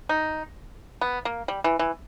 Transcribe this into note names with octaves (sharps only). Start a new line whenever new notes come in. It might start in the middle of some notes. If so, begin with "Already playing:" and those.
D#4
B3
A#3
G3
E3
E3